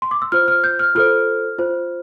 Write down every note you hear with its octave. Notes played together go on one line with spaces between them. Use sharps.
C6
D6
E6
F4 C5 F6
F6
G6
F6
F4 A4 C5 F6
F4 C5